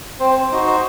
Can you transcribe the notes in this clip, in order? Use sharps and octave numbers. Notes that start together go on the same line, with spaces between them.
C4 C5
C5
D#4 F#4 C5
C5